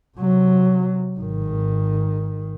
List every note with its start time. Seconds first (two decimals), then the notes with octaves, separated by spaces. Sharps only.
0.18 C3 F#3
1.19 G#1 D#3